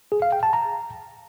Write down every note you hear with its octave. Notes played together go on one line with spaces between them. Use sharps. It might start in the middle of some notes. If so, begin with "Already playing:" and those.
G#4
F5
G5
A5
A#5